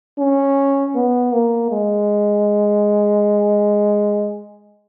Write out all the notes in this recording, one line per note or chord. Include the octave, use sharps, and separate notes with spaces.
C#4
B3
A#3
G#3